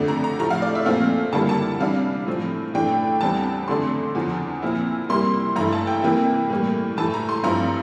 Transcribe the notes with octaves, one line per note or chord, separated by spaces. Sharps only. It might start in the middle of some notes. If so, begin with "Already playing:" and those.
Already playing: F2 D3 A3 D4
A#5
A#5
A2 F3 A3 A#5
F5
D5
E5
A#2 F3 A3 C4 F5
D3 G3 A#3 E4 A5
A5
C3 E3 G3 D4 F5
A2 F3 C4
A2 E3 A3 D4 G5
E2 E3 G3 C4 A5
F2 D3 A3 D4 C6
E2 D3 F3
A#2 F3 C4 E4
C3 G3 A#3 E4 C6
G2 E3 A3 E4 A#5
A5
G5
C3 E3 A#3 E4
A2 G3 A#3
A2 E3 A3 A5
A#5
C6
G2 F3 C4 E4 A#5